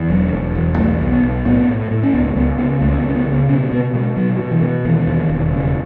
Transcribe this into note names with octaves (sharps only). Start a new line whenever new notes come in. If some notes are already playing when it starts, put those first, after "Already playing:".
Already playing: E2
E1 F#3
E1
E2
B1 A3
B1
B3
B1
A2 B3
A2
A2
C#4
C#2 B3
C#2 B3
C#3 B3
C#2 A3
B3
C#3
C#4
B3
C#3
B3
B2 C#4
A3
B2 B3
B2 G#3
B2 F#3
B2
E3
B2
D#2 E3
D#2
E1
C#3